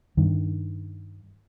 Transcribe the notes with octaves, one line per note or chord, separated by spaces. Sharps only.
G2 D#3